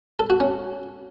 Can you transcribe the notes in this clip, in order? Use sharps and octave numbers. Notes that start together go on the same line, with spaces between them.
A4
F#4
C#4